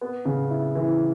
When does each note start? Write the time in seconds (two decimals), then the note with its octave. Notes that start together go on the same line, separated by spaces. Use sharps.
0.01 B3
0.25 C#3
0.50 E4
0.75 E3